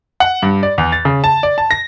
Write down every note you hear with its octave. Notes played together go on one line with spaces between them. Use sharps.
F#5
G2
D5
E2
A6
C#3
A5
D5
A5
A#6